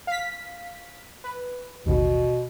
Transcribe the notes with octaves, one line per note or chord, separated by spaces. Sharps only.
F5 B6
B4
A1 D#2 B2